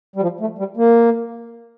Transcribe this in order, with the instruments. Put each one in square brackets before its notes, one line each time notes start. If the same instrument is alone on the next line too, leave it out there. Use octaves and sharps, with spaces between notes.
[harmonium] G3
F3
A3
G3
A#3